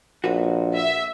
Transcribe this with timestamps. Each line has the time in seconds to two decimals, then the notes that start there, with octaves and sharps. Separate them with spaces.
0.24 A#1 F#4 B4
0.77 E5